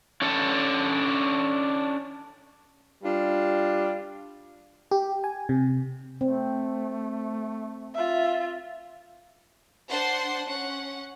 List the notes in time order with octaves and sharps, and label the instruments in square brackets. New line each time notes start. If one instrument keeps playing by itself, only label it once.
[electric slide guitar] C#4 D4 A4
[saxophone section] G3 D4 F4
[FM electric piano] G4
G#5
C3
[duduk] A3 [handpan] C4
[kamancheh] F4 E5
[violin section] D4 C5 F#5 A5 C6
C#4 F#5